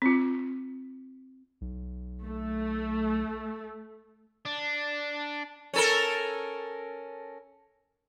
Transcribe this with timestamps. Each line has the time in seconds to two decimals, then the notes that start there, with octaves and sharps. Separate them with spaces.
0.02 C4 F4
1.61 B1
2.26 A3
4.45 D4
5.74 C#4 A4 A#4